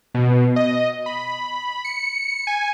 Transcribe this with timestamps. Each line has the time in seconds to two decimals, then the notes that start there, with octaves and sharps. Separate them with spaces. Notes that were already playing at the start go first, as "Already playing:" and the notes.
0.14 B2
0.56 D#5
1.06 B5
1.84 C#7
2.47 G#5